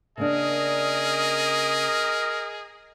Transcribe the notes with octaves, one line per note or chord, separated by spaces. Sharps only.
C#3 A#3 D4 G#4 A#4 D#5